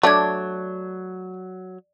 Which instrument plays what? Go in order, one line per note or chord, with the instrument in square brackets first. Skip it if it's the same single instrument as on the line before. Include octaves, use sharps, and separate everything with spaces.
[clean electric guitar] F#3 [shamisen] A3 D4 [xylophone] D5 G#6 [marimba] A5 D6